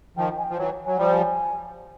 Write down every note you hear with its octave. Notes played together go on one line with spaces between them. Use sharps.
D#3 F3 G5
G#5
G5
F3
E3 F#3
F#3 G#5
F3 G3 G5
G#5